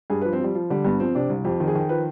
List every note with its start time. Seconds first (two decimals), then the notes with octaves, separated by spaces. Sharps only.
0.10 G2 G#4
0.22 F3 B4
0.33 C4
0.40 F3 G3
0.55 F3
0.70 D3 G3
0.85 G2 B3
1.00 F3 C4
1.15 C3 D4
1.30 C2
1.44 F2 G4
1.60 D#3
1.68 G#4
1.75 D#3
1.89 F3 B4